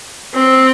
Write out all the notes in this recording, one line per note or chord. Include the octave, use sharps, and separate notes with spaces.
C4